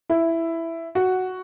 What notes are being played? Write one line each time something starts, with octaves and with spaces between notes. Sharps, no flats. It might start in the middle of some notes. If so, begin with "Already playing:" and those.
E4
F#4